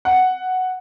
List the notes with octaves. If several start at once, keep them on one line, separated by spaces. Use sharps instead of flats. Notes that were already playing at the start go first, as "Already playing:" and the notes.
F#5